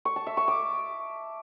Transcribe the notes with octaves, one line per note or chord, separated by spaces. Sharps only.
C#6
A5
E5
C#6
D6